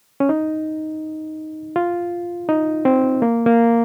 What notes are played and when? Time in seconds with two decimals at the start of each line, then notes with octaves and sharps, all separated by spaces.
0.20 C#4
0.29 D#4
1.76 F4
2.49 D#4
2.85 C4
3.22 A#3
3.46 A#3